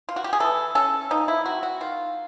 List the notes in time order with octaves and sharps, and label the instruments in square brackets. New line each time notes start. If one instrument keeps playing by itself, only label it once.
[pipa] F4
F#4
G4
G#4
E3 A4
C#4 A4
F3 D#4
E4
C4 F#4
F#4
D#3 F4